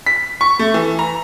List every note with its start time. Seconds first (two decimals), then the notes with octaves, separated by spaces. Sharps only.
0.06 B6
0.41 C#6
0.59 A3
0.74 E3
0.99 A#5